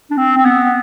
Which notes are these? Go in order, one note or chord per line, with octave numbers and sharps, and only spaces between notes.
D4
C4
C4
B3